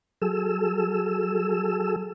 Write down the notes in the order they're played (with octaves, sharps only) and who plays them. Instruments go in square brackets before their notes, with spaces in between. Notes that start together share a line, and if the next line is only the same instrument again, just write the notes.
[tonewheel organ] F#3 G#4 A4 E6